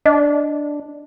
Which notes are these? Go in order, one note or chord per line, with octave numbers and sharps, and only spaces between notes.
D4 D#5